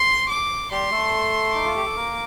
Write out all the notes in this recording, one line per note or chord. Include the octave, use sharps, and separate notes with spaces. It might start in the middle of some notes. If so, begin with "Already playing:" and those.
Already playing: C6
D6
G3 G4 C6
A3 A4
D#4 D6
F4
G4
A4
A#3 A#4